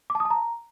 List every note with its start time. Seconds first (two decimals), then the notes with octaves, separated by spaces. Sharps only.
0.10 D6
0.15 A5
0.20 D#6
0.25 A5
0.30 A#5